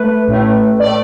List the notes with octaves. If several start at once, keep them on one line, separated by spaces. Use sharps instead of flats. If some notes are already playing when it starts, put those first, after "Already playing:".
Already playing: A3 B4
A1 A2 A3
A2 A3 D5